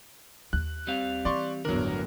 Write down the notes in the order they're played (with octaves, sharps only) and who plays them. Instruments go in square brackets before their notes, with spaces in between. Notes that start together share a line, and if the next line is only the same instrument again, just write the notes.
[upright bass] D#2 [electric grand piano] F#6
[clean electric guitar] G3 C4 F5
[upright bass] E3 [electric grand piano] D5 C6 C#6
[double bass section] G1 E2 A2 [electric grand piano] F#3 A#4 [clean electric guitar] D4